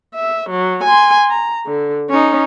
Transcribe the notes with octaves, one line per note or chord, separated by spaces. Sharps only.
E5
F#3
G#5 C6
A#5
D3
C#4 D#4